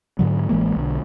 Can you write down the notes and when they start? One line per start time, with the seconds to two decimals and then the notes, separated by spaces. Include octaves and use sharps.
0.19 G#2 D3 F#3
0.49 A1 E3 G#3 A#3
0.76 B1 D3